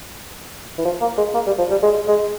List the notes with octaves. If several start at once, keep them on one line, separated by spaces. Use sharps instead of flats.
E3
F3
A#3
G#3
A#3
G3
F3
G3
G#3
G#3